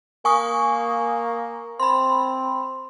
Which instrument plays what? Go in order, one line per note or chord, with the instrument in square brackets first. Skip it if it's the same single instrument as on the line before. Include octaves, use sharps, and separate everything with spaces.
[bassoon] A#3 [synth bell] G#5 C#6 D#6
[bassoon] C4 [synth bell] B5 C6